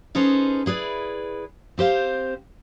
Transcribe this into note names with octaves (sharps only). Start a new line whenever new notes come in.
C#4 D#4 G#4 A4 B4 C5
E4 G#4 B4 D5
C4 G4 C5 F5